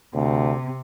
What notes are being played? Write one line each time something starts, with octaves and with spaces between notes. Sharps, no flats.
D2 C3